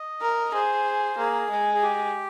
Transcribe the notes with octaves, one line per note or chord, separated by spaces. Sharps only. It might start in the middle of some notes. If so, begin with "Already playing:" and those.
Already playing: D#5
A#4
G#4 C5
A#3 G#4
G#3
G#4
G4